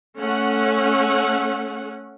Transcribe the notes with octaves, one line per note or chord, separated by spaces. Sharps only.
A3 C#4 F#5